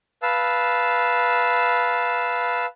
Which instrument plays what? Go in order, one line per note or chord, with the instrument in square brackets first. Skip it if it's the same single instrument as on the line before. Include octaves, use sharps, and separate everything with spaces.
[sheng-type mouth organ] B4 F5 A5 E6